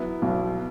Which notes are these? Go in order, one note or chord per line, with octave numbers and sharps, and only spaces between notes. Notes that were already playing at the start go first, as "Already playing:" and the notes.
Already playing: F#3 B3 E4
B1 B2